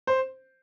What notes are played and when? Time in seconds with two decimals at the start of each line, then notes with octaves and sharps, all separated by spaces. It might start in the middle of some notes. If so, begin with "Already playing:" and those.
0.07 C5